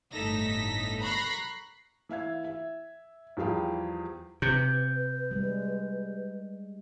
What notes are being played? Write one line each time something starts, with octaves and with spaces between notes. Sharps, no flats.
G1 A2 D#4 A4 A#6 B6
A#5 B5 C#6 F#6 A#6 C7
E3 E5 F5 G#6
E5
E2 F3 G3 G#4 F5 G5
C3 B4 G6
G3 G#3